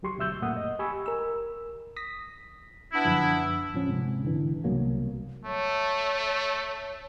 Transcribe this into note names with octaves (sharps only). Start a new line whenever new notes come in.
D2 F#3 G4 C6 C#6
D2 B2 F#3 E5 E6 G6
F#2 A#2 A3 A#3 F#5 D#6
D#5
G4 G#5 B5 C#6 E6
A#4 E6
D#6 A#6 B6
B3 D4 E4
F#2 D3 F3
D1 F3 C#4
G#2 C3
D3 E3
C2 B2 F#3 A#3
A3 C#5